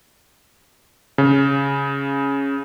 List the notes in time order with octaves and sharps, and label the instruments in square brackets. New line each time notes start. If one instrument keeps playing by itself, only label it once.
[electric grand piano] C#3